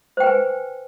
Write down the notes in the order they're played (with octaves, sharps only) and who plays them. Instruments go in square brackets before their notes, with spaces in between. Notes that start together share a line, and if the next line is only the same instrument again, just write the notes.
[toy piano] C5
G5
B4
G#5